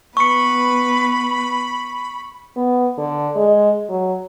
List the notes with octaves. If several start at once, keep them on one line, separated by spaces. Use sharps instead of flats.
B3 B4 B5 C#6 C#7
B3
D3
G#3
F#3